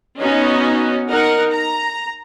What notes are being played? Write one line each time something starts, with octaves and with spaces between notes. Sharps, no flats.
B3 C#4 D#4 F#4
D#4 A#4 F#5
A#5